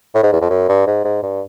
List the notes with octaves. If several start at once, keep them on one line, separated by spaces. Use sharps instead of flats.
A2
G#2
E2
F2
F#2
G2
G#2
G#2
G2